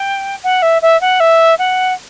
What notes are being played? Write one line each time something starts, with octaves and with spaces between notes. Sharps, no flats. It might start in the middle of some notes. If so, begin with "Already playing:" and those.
Already playing: G5
F#5
E5
E5
F#5
E5
F#5